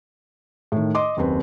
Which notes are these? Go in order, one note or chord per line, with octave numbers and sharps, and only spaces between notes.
A2 D#3
D#5 C6 D6
F#1 D#2 C4 B4